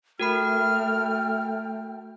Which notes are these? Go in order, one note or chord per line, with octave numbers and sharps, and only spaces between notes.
A3 F#4 A#4 G5 B5 F6